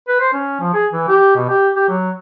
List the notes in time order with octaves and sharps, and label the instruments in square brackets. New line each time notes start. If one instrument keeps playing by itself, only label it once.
[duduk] B4
C5
C#4
F3
G#4
E3
G4
B2
G4
G4
F#3